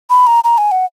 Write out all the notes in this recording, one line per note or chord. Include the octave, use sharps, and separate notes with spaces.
B5
A#5
A#5
G#5
F#5